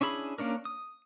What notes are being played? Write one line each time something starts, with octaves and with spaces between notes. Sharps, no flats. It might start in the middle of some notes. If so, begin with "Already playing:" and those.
C#4 D4 E4 G#4 B5
A#3 C#4 D4 A#4
D#6